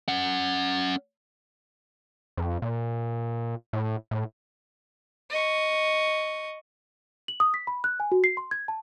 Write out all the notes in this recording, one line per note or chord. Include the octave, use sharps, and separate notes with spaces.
C#4 F#5
F2
A#2
A2
A2
D#5 C#6
F#7
D#6
B6
B5
F#6
G#5
F#4
C7
C6
G#6
A5